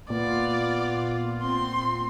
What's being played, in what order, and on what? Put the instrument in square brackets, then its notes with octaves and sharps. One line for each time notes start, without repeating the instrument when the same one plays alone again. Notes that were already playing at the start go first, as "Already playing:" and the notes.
[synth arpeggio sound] A#2 [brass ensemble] B3 F4 [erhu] D5
[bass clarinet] C4 [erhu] C6